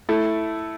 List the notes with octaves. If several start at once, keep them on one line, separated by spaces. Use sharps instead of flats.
A3 E4 A4